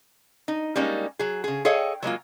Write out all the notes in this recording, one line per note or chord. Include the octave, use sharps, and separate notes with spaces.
D#4
G3 G#3 A#3 C#4 D#4
F#3 G#4
C#3 G#4
G#4 A4 C#5 D#5 F5 G5
F#3 G#3 A#3 F4